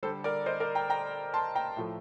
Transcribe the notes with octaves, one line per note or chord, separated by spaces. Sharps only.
D3 G3 A4 C5
A#4 D5
C5 D#5
A#4 D5
G5 A#5
G5 A#5
A5 C6
G5 A#5
A2 F3 A3